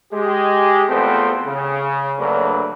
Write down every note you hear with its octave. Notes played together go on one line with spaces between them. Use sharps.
G#3 G4
E2 A3 B3 C4 F4 C5
C#3
D2 C#3 F#3 A#3 D4 B4